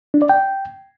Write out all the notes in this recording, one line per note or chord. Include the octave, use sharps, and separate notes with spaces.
D4
D5
G5